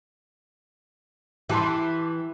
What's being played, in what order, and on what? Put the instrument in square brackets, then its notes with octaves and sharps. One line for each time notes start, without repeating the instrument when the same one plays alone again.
[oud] E3 [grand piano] G4 A5 C6